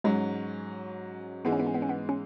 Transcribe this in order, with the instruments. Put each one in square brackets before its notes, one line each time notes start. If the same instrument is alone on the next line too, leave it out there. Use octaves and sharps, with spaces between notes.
[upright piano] G#2 F#3 C#4 [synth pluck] G#3
[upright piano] G#2 E3 G#3 [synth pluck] B3
[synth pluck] C#4
B3
C#4
B3
C#4
B3
C#4